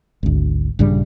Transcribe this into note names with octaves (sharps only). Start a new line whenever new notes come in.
G#1 D2
A#1 G2 C#3 G3